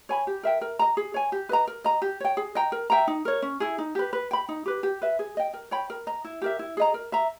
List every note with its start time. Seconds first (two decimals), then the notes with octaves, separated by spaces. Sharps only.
0.09 C#5 G#5 B5
0.27 G4
0.43 A#4 E5 G5
0.61 A#4
0.79 D#5 A#5
0.97 G#4
1.14 C#5 G#5
1.32 G4
1.49 B4 D#5 A#5
1.67 A#4
1.84 D#5 A#5
2.02 G4
2.20 C#5 G5
2.37 G#4
2.55 D#5 G5 A#5
2.72 A#4
2.90 E5 G5 A#5
3.07 D#4
3.25 A#4 C#5
3.42 C#4
3.60 E4 G#4
3.78 D#4
3.95 G4 B4
4.13 B4
4.31 G5 B5
4.49 D#4
4.66 G4 B4
4.83 G4
5.02 B4 E5
5.19 G#4
5.37 D#5 G5
5.54 A#4
5.71 C#5 G5 B5
5.90 A#4
6.07 D#5 A#5
6.24 E4
6.42 G4 A#4 E5
6.59 E4
6.77 G#4 D#5 A#5
6.94 A#4
7.12 E5 A#5